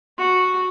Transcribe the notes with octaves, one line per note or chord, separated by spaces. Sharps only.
F#4